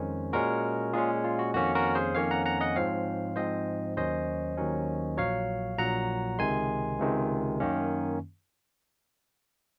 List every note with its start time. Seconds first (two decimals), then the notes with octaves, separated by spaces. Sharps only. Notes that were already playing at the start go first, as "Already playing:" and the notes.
Already playing: F2 D#3 G#3 C#4 G#4 C5
0.33 A#2 G#3 C#4 F#4 A#4
0.93 A#2 G#3 C#4 F4 G#4
1.24 F4
1.39 F#4
1.54 F2 D#3 A#3 C#4 F#4
1.75 F#4 A#4
1.95 G#4 C5
2.15 F2 D#3 A#3 C#4 C#5 F5
2.31 F#5 A#5
2.45 F#5 A#5
2.61 D#5 F#5
2.76 G#2 F3 C4 C#5 F5
3.36 G#2 F3 C4 C5 D#5
3.97 D#2 D#3 F#3 C#4 C5 D#5
4.57 D#2 D#3 F#3 C#4
5.17 A#1 A#2 F#3 C#5 F5
5.78 A#1 A#2 F#3 F#5 A#5
6.38 C#2 C3 D#3 G#3 G#5 C6
6.99 C#2 C3 D#3 G#3
7.60 F#2 D#3 A#3 C#4